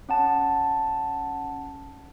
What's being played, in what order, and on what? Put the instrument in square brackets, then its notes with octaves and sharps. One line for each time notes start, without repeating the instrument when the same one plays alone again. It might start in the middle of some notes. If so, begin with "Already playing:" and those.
[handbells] C#4 F#5 A5